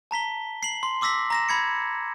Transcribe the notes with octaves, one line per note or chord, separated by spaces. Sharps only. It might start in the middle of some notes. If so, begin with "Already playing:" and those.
A5 A#5 B6 G7
C7 F#7
C6
C6 D6 E6 A#6 B6
A#5 A#6 E7
B5 G#6 C#7